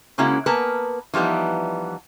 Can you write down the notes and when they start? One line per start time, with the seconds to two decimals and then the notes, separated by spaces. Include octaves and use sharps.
0.18 C#3 G#3 A#3 C#4 E4 F#4
0.46 A#3 B3 A#4 B4 G#5 A5
1.13 E3 F3 G3 B3 D#4